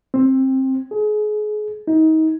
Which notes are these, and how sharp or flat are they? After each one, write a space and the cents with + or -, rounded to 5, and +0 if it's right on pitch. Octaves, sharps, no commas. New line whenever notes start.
C4 +20
G#4 +30
D#4 +30